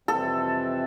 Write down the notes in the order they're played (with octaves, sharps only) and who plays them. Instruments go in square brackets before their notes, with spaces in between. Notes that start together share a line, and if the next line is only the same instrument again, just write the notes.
[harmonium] F2 C3 E3 G3 C4 [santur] A4